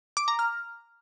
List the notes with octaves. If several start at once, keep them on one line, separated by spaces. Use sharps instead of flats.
D6
A#5
F6